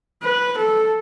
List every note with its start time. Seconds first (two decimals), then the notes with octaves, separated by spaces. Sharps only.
0.23 B4
0.58 A4